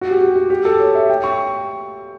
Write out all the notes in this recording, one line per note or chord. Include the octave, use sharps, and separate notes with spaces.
F#4
G4
G4
F#4
G4
A4
C#5
E5
G5
C#6